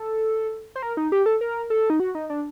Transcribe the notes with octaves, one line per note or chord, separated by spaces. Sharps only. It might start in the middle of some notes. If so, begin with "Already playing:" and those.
Already playing: A4
C5
A#4
D#4
G4
A4
A#4
A4
D#4
F#4
D#4
D4